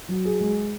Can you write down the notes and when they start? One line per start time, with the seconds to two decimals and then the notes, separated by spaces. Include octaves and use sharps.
0.09 F#3
0.25 G#4
0.41 G#3